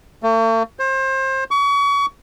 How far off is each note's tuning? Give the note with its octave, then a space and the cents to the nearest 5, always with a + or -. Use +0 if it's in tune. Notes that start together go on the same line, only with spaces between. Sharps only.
A3 +45
C5 +30
C#6 +35